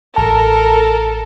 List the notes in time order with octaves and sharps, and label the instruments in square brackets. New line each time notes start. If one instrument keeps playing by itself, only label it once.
[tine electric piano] A1 A5 [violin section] A4 A#4